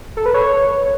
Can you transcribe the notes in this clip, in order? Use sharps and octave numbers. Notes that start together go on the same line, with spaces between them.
A4
B4
C#5